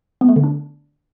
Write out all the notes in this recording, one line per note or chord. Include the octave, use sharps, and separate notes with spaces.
B3
A3
D3
D4